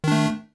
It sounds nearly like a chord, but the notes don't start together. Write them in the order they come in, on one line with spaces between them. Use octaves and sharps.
D#3 D4 A3